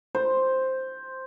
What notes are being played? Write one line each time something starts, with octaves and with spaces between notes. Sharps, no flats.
C5